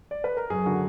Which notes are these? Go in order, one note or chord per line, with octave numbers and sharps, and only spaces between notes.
D5
B4
A#4
F#2 G#4
D3 F#4